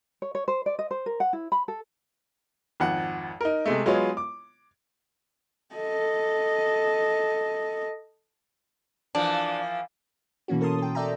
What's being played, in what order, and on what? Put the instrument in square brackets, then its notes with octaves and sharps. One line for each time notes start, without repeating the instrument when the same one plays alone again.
[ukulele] C#5
C#5
C5
D5
D#5
C5
A#4
F#5
E4
B5
A4
[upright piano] G#1 F2 F#5
D#4 A#4
C3 G#3 A3
F#3 G#3 B3 F4 C#5
D6
[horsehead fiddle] A4 D#5
[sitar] E3 F3 A#3 [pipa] D4
[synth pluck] B2 E3 A#3 C#4 F#4
A4 A#4 A5 C6 D#6
A4 G5
A4 D5 E5 G5 A#5